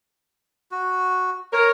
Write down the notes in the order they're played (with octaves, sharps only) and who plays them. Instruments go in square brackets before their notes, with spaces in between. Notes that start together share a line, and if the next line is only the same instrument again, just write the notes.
[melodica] F#4
[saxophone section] A#4 [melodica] C#5